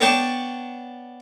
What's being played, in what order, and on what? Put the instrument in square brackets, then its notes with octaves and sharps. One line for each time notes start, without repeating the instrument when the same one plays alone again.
[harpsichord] B3 D4 C#5 D5 G5 A5